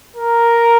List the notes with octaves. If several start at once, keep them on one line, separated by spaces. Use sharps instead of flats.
A#4